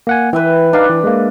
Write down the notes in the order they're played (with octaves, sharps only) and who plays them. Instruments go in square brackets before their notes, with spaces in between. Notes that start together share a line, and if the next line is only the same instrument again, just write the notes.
[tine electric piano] A#3 F#5 G#5
[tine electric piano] E3 [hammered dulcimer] B4 E5 G5
[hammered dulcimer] D4 [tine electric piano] D#4 B4 F5
[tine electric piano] E3
G#3 A#3